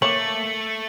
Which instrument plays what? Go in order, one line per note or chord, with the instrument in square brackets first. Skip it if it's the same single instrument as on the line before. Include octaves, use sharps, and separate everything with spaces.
[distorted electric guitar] A3 [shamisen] A#3 C#5 [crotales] F#7